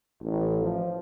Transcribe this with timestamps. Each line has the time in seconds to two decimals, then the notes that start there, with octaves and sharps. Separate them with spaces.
0.23 A1
0.62 F3